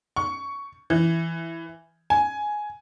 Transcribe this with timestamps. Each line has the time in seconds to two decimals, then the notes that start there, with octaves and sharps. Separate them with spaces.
0.16 C#6
0.90 E3
2.10 G#5